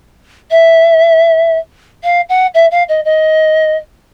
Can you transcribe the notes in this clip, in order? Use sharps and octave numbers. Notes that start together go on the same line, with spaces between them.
E5
F5
F#5
E5
F5
D#5
D#5